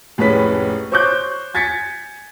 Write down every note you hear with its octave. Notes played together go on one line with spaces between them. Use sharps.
F1 A2 G#3 C#4 B4 B6
C5 C#5 C#6 D6 F#6 G6
G#5 G#6 A6 B6 C#7